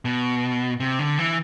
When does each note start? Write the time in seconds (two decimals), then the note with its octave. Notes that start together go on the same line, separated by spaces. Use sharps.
0.05 B2
0.80 C3
0.99 D3
1.18 E3